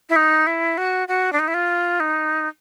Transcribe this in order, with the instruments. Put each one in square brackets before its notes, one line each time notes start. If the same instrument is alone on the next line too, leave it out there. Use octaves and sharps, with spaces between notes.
[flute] E4
D#4
E4
F#4
F#4
D4
D#4
E4
F4
D#4